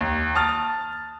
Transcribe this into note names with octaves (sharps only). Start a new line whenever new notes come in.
D#2
A5 D#6 F6 A6